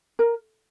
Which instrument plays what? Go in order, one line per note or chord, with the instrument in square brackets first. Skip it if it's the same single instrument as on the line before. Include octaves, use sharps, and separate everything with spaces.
[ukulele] A#4